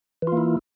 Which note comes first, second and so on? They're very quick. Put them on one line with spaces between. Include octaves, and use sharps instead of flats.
E3 F4 A#3 E4